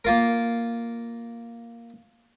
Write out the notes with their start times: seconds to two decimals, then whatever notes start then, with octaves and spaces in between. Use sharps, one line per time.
0.05 A#3 F4 A#4